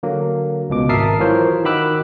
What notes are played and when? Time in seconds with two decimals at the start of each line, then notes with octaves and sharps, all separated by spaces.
0.03 D3 F#3 A#3
0.70 C#2 B2 D6
0.89 G#1 A#4 E5 A5 D#6 C7
1.19 E3 F#3 F4 A#4 C5 C#5
1.64 D#3 F#4 B5 D6 E6 F#6